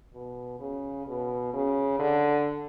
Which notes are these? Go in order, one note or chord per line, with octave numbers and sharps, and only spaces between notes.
B2
C#3
B2
C#3
D3